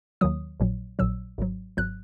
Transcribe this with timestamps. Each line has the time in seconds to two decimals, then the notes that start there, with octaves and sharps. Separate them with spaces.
0.21 D#2 D#3 F#3 D#6
0.60 A#1 A#2 F#3
0.99 A#1 A#2 F#3 E6
1.38 G#1 G#2 F#3
1.77 G#1 G#2 F#3 F#6